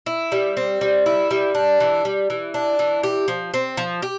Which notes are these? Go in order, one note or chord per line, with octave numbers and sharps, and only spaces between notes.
E4
G3
C4
G3
E4
G3
D4
E3
G3
E3
D4
E3
G4
F3
C4
F3
G4